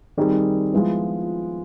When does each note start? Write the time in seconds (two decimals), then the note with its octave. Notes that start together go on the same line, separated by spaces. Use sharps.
0.17 D#3 G3 C4 D#4 G#4
0.73 F3 G#3 B3 E4